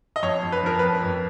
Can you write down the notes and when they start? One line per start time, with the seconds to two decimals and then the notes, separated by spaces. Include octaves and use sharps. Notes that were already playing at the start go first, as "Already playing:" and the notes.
0.16 D#5
0.23 F2 C#5
0.43 F2
0.52 B4
0.63 F3 A#4
0.79 F2 B4
1.03 F2